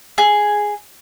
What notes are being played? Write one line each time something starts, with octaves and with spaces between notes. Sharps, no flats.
G#4